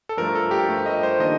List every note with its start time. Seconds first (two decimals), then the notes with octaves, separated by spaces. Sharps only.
0.09 A4
0.17 G2 F3 A3 A#4
0.35 A4
0.51 G4
0.69 G2 F3 A3
0.86 D#5
1.03 C5
1.19 D#3 A#3 D4 D#5